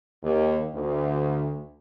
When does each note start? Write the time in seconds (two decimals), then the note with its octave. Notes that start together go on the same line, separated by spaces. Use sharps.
0.23 D#2
0.75 D2